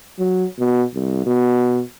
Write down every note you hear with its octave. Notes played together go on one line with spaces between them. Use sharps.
F#3
B2
C2
B2